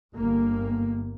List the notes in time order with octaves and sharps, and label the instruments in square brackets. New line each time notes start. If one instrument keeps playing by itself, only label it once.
[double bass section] G1 A#3